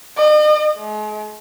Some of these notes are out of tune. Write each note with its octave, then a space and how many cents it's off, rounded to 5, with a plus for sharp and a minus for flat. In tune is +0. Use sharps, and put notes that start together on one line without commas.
D#5 -40
G#3 +40